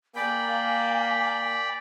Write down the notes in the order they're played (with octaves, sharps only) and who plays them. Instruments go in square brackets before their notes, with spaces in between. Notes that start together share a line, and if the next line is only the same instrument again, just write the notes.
[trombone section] A#3 [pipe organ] D5 G5 B5 [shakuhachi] G#5